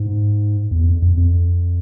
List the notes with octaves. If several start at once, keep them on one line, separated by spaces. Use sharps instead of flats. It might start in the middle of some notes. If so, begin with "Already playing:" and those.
Already playing: G#2
E2
F2
F2
F2